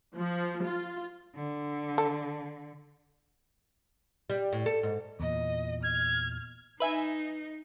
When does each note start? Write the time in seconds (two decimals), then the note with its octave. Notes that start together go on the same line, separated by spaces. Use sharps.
0.16 F3
0.64 F4
1.36 D3
1.98 A4
4.30 G3
4.52 A2
4.66 A4
4.83 G#2
5.20 E2 A#2 D#5
5.83 F6 G#6
6.80 D#4 B4 E5 G#5